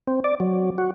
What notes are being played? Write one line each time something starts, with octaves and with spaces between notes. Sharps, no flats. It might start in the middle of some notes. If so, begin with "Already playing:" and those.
C4
D5
F#3
F#4